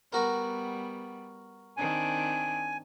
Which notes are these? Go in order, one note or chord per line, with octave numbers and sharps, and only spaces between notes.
G3 B3 F#4 A#4
D#3 C4 D4 G#5